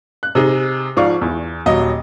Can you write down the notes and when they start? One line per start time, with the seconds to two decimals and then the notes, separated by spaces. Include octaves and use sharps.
0.23 F#6
0.35 C3 D#4 G#4
0.97 G#2 F3 D5 F5 C#6
1.21 E2 E4
1.66 D#1 F#3 D#5